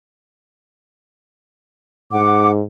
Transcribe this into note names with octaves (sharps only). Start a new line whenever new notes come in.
G#2 F#5 D6